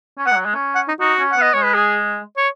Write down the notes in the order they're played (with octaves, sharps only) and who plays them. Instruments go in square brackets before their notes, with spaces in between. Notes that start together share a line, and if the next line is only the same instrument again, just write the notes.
[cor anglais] C#4
[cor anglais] G#3 B3 [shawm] F#5
[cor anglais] F#3
G#3
C#4
[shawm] F#5
D#4
[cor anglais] D#4 [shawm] F#4
[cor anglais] C#4
[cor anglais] B3 [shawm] F#5
[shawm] D#5
[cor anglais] G#3 [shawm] C#5
[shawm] B4
G#4
C#5